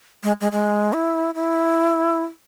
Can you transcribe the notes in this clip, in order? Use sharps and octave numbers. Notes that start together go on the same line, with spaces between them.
G#3
G#3
G#3
E4
E4